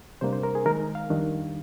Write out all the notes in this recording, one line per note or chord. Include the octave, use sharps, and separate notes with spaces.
C3 G3 A#3 D4 C5
C5
A#4
G#4
D#3 G#3 D#4 A#4
F5
F2 D#3 G3 D4